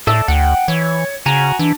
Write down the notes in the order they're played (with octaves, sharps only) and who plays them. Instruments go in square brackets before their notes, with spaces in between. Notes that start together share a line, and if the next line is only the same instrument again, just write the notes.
[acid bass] A2 [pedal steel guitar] A4 D5 E5
[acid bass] D2 [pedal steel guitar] F#5 G5
[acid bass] E3 [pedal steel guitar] C#5
[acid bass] C#3 [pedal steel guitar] F#4 G#5 A#5
[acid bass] E3 [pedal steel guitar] D4